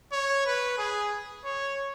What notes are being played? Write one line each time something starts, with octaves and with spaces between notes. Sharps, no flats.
C#5
B4
G#4
C#5